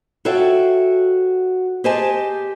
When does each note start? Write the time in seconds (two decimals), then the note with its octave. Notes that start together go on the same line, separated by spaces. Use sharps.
0.25 F#4 A4 C#5 E5 F5 G5
1.84 G4 G#4 C5 D#5 G#5 A5